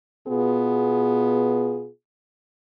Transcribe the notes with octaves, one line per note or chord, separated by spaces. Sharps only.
B2 B3 F4 G#4